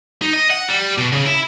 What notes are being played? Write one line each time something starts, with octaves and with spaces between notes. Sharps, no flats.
D#4
D#5
F#5
G3
B2
C#3
E4